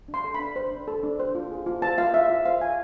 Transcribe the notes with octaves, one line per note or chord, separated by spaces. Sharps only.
D4
C6
A4
D4 B5
C5
D4
A4
D4
C5
F4
G#4
F4
C5 A5
F4 F5
G#4 E5
F4
C5 F5
F4 G#5